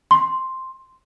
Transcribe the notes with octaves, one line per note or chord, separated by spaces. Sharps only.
C6